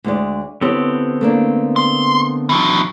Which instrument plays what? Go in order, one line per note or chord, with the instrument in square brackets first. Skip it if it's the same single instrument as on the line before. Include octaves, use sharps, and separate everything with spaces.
[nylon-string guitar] D2 G#3 D5
[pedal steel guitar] D3 B3 C4 [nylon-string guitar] E4 G4 C#5
[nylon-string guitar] A3 A#3 D4
[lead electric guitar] C6
E3 F#3